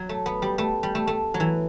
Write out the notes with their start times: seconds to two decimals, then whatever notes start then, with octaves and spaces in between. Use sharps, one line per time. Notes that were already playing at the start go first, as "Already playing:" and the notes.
Already playing: F#3
0.09 A3
0.26 B3
0.42 G3
0.58 A3
0.83 G3
0.95 A3
1.07 A3
1.34 F#3
1.40 E3